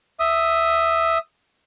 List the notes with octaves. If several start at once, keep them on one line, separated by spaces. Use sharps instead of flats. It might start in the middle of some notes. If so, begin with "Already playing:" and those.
E5 D#6